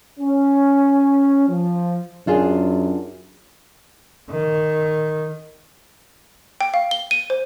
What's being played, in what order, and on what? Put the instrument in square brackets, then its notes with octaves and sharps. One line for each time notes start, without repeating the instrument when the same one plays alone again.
[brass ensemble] C#4
F3
[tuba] F#2 [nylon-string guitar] D4 F4 G#4
[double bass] D#3
[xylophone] G5
F5
G7
D#7
C5